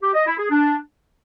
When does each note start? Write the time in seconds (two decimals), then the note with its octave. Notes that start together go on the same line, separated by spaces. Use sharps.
0.02 G4
0.14 D#5
0.26 E4
0.38 G#4
0.50 D4